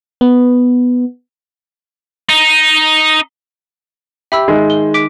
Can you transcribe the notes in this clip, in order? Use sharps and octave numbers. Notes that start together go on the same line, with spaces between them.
B3
D#4
G4 E5 B5 E6
D#3 G#3
G7
D6 B6 D7